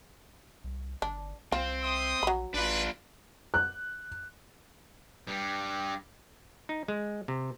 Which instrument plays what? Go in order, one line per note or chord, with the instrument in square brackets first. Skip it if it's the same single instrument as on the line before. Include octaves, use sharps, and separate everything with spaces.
[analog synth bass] C2
[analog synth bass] G1 [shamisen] D4
[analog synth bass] C2 [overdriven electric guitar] C4 [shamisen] F4
[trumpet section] E5 C6 D#6
[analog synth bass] A#1 [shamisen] F#3 B5
[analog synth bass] A1 [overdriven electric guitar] D4 F4 [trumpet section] B4
[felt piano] F#6
[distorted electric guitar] G2 G3
[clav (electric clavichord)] D#4
G#3
C3